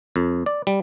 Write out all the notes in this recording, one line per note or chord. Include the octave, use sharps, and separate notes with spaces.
F2
D5
G3